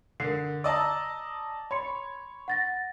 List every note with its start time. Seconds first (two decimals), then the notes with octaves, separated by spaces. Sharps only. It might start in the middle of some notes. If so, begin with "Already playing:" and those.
0.20 D3 A#4 C7
0.64 D5 D#5 A5 A#5 E6
1.71 C#5 B5 C6 C#7
2.48 F#5 A6 A#6